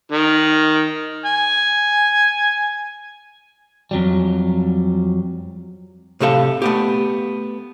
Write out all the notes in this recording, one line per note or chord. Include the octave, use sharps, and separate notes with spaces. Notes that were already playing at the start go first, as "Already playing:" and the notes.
D#3
G#5
F2 F#3 G3
A2 C3 G4 A4 F5
A3 B3 G4